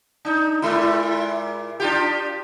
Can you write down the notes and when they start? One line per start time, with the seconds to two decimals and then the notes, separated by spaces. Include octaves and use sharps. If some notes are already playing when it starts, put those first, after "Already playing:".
0.25 D4 D#4
0.62 A#2 G#3 E4
1.80 D4 F4 G4